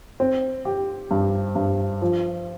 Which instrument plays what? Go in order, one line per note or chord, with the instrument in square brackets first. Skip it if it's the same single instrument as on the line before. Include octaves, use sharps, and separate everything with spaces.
[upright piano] C4
G4
G2
G2
F3